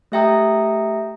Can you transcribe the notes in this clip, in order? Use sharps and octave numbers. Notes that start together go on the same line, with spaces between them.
A3 G4 E5 G5 A#5 D#6